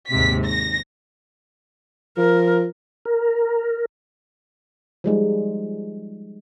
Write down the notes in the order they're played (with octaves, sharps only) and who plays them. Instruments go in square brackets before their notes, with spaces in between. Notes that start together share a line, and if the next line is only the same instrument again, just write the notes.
[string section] D#2 G#2 C3 B6
A#6
[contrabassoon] F3 [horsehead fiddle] A#4
[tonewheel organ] A#4
[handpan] F3 G3 G#3 D#4